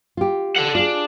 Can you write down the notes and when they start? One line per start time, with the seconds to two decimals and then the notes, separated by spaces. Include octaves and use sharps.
0.17 F4 G4
0.56 A4 F#5
0.75 D4 F4 G#4